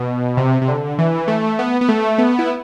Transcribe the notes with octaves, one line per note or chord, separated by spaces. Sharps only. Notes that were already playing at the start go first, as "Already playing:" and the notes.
Already playing: B2
C3
C3
D3
E3
A3
B3
B3
A3
B3
E4